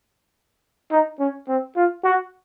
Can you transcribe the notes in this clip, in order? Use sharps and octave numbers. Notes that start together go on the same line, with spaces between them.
D#4
C#4
C4
F4
F#4